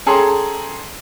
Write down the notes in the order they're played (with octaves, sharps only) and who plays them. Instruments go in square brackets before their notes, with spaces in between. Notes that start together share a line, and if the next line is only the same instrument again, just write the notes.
[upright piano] C#4 G#4 A4 G5 A#5 C6